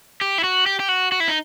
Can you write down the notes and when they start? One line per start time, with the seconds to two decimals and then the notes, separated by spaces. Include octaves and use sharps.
0.21 G4
0.38 E4
0.44 F#4
0.66 G4
0.80 G4
0.89 F#4
1.12 F#4
1.20 E4
1.28 D#4